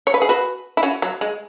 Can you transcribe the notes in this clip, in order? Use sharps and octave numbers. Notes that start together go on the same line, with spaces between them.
C#5
B4
G#4
F#4 B4
E4
C#4 F#4
F#3
G#3